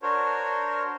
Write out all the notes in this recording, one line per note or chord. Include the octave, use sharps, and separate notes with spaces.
D4 F#4 A#4 C5 C#5